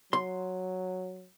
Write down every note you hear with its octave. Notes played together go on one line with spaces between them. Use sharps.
F#3 C6